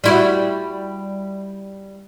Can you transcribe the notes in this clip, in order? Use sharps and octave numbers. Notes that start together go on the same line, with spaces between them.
G3 E4 F#4